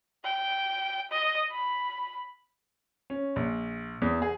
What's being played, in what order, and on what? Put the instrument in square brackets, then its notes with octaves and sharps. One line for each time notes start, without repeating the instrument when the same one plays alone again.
[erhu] G5
D#5
B5
[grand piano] C#4
A#1
E2
G#4